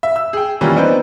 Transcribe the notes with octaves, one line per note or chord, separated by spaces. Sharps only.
E5
E6
G#4 G5
E3 G3 A#3 C#4 F4
B3 C4 D4 D#4 B4 C5